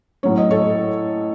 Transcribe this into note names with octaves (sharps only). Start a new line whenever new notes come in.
A2 F#3 C#4 C#5
D#5
A4 C#5